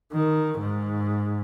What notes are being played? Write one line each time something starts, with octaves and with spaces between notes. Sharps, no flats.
D#3
G#2